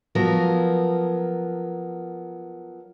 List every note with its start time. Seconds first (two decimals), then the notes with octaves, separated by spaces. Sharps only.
0.15 F3 F#3 B3 A#4